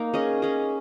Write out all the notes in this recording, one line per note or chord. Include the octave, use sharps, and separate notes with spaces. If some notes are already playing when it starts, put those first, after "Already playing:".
Already playing: A#3 D#4 A#4
C#4 G#4 D#5
C#4 G#4 D#5